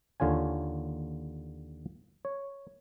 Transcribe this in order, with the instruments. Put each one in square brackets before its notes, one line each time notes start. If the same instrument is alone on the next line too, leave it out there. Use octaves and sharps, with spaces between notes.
[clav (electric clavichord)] D#2 D3 F4 C#5 G#5
C#5